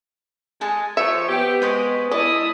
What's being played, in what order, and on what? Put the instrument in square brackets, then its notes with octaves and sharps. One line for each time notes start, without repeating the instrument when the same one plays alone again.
[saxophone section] G#3 [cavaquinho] A4 G#5 A5
[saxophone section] F3 C#5 [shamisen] E5
[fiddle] B3 [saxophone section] G4
[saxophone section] G#3 [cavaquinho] C5 C#5 D#5
[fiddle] E4 D#6 [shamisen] D5 [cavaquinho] D#5 A5